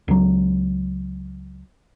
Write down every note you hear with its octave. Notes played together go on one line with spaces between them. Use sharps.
C#2 F#3